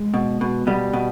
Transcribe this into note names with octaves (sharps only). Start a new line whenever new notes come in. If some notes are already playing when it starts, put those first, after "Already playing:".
Already playing: G#3
B2
B2
B2 G3
B2